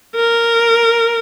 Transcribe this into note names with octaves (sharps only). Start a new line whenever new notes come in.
A#4